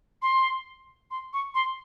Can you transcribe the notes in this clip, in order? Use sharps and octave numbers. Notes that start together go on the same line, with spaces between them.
C6
C6
C#6
C6